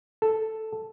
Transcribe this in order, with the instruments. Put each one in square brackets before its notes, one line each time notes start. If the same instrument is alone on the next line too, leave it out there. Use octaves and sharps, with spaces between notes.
[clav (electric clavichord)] A4